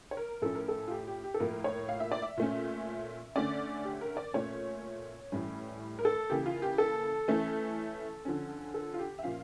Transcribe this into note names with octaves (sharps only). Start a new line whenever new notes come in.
C#5
A#4
A2 F3 C#4 A4
A#4
A4
F4
G4
G4
G4
A4
A2 F3 A#3 A#4
C#5
F5
E5
D5
E5
A#2 A3 C#4
D3 A3 C#4 D5
G4
A#4
D5
A#2 A3 C#4 C#5
A2 E3 G3 C#4
A#4
A4
C#3 E3 A#3 G4
F4
G4
A4
E3 A3 C#4
D3 F3 C#4
A4
F4
G4
E5
A#2 F3 C#4 F5